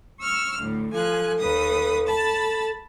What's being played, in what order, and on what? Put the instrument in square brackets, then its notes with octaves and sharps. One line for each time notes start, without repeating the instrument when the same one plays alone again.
[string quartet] C#6 E6 F6
D2 A2
[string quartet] F3 G#5 F#6 [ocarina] A4
[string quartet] D#2 B4 D#6
A5 B5